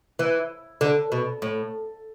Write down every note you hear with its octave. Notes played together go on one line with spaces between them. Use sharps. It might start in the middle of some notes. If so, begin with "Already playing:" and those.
E3
D3
B2
A2